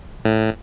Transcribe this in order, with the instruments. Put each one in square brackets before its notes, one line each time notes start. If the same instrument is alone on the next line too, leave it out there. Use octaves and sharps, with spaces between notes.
[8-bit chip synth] A2